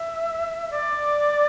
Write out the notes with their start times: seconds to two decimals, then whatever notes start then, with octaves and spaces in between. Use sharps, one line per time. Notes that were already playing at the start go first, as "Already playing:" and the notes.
Already playing: E5
0.71 D5